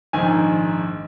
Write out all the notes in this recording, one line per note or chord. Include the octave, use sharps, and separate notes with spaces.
A#1 G#2 D#3 G#5